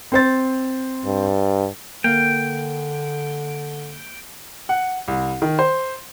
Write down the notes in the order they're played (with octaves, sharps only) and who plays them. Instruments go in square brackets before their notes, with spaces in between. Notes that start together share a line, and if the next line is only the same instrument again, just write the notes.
[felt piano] C4 C5 A6
[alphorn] G2
[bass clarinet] D3 [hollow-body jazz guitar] A#3 [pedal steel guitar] G5
[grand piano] F#5
C2
D#3
C5